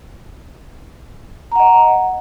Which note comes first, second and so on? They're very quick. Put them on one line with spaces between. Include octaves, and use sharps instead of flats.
A#5 F#5 D#5